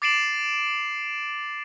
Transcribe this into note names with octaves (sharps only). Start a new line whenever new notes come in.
D6 A6 C7 D7 E7 F#7